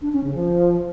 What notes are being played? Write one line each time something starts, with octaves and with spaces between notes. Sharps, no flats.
D4
C#4
C#3
F3